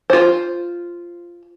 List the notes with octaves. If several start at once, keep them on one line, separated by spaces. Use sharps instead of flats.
F4 C5